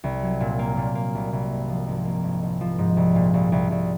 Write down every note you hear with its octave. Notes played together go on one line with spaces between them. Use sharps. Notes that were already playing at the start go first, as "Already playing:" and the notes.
C2
F#3
A#2
A#3
A#2
A#3
C2
C2
G#1
F3
G#1
A#3
G#1
G#1
F3
G#2
C2
A#2
C2
C2
C2